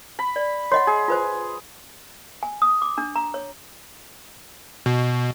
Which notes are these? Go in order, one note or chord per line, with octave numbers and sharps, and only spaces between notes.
B5
D5
C#5 D#5 F#5 C6
G#4
F4 B4 C5
G#5
D#6
D6
D4
A#5
C#5
B2